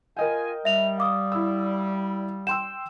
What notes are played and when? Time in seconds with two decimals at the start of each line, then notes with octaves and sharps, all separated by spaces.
0.17 F4 A#4 D#5 G5 G#5
0.65 G3 E5 F7
0.98 F5 D6 D#6
1.32 E4 E6
2.47 G5 C6 E6 E7